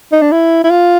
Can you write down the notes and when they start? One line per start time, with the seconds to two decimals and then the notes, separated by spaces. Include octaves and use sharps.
0.12 D#4
0.22 D4
0.31 E4
0.63 E4
0.70 F4